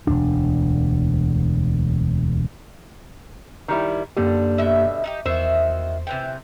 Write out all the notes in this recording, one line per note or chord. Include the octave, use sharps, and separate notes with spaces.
E1 D2 D4
D#3 G3 E4
F#2 D3 G3 A#3 G4
B2 E5
D#4 E4 G4
E2 D#3 F#4 C5 E5
C3 E3 G5